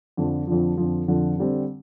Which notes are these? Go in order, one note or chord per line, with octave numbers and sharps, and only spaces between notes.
F2 D3 F3
F2 D3 F3
F2 D3 F3
F2 D3 F3
D3 G3 C4